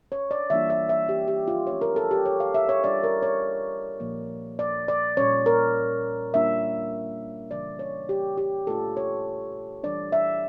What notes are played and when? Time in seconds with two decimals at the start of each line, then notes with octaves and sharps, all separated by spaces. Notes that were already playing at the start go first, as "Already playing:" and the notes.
0.12 C#5
0.31 D5
0.50 E3 G3 A#3 D4 F4 E5
0.70 E5
0.89 E5
1.09 G4
1.28 G4
1.48 F4
1.67 F3 A3 C#4 F4 C#5
1.81 A#4
1.96 A4
2.11 G4
2.26 C#5
2.40 F5
2.54 E5
2.69 C#5
2.84 G3 D4 F4 D5
3.04 A#4
3.22 C#5
4.00 A#2 F3 A#3
4.59 D5
4.88 D5
5.17 A#2 G3 C#4 C#5
5.46 A#4
6.34 G3 A#3 D4 F4 E5
7.50 C#3 E3 G3 A#3 D4 D5
7.79 C#5
8.09 G4
8.37 G4
8.67 A#2 A3 D4 F4 A4
8.97 C#5
9.83 E3 G3 D4 D5
10.12 E5